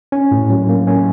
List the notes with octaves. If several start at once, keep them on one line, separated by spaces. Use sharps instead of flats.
C#4
A2
F#3
A#3
C#4